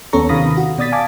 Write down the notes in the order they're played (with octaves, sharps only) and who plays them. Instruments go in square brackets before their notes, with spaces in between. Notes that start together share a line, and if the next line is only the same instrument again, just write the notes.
[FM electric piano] D#2 B3 C#4 A4 A#5 C#6
C3 D#3 F5 B5 D#6 A#6
F#4
B2 D5 D#6 A6 B6
F5 G#5 A5 D6